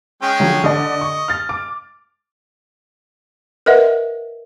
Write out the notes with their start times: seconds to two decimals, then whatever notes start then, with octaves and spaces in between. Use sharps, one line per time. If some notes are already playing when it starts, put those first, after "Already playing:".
0.22 G#3 C#4 G5
0.40 D3 F3 F#3
0.64 D3 D4 D5 D#5
1.01 C#6
1.28 F6 A6
1.49 D6
3.66 A#4 B4 D#5 E5 F#5